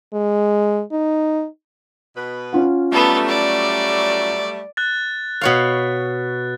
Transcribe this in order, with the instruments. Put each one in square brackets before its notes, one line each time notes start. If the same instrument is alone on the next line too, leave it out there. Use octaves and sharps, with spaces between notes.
[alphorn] G#3
D#4
[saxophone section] B2 B4
[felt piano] C#4 F4 F#5
[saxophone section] F#3 G3 A3 [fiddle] B3 A4
[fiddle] D5
[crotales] F#6 A6
[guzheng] B2 C#5 F5